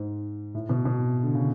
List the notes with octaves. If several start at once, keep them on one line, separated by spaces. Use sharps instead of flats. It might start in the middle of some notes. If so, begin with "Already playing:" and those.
Already playing: G#2
A2
B2
B2
D3
C#3